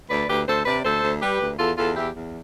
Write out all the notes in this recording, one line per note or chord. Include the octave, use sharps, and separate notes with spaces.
D2 B4 D5
D2 G4 B4
D2 A4 C5
C3 B4 D5
D2 A4 C5
D2
G3 G4 B4
D2
E2 F4 A4
E2 F4 A4
E2 E4 G4
E2